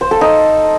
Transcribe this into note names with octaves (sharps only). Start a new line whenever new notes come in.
C5
A4
D#4